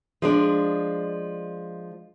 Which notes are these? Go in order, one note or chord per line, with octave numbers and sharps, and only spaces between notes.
F3 G#3 D4